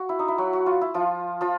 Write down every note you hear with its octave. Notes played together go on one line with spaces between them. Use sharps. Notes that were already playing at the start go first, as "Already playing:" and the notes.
Already playing: F#4
E4
D#4
E4
F#3 F#4
F#4
F4
E4
F3 F4
F3 F4